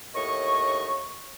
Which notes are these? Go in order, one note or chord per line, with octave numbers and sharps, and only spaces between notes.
D#2 A2 D#5 C#6